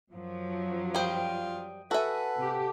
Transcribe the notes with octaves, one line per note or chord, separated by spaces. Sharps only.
F#2 F3 F#3
G3 F4 C5 D#5 G5
F#4 A4 B4 E5 F#5 G#5
C3 G4